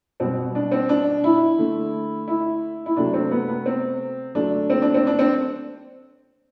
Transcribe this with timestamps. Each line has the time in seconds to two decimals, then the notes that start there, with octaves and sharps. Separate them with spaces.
0.20 B2 G3 C4
0.55 D4
0.72 C4
0.89 D4
1.24 E4
1.58 D3 A3
2.28 E4
2.86 E4
2.97 C3 F#3 A3 D4
3.14 C4
3.31 B3
3.48 B3
3.66 C4
4.35 D3 F#3 A3 D4
4.70 C4
4.82 D4
4.94 C4
5.07 D4
5.19 C4